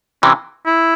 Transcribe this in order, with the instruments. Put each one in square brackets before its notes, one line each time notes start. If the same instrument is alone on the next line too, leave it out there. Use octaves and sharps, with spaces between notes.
[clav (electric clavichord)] C3 E3 [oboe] C#4
[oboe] E4